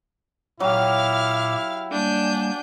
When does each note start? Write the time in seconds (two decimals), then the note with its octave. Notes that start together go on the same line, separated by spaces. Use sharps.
0.60 A#2 F#3 E4 G4 F5 D6 F6
1.92 G3 A#3 D4 G#5 G6